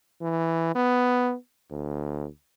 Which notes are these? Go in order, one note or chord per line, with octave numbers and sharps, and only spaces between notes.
E3
B3
D2